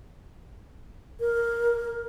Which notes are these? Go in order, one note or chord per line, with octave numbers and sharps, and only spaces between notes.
A#4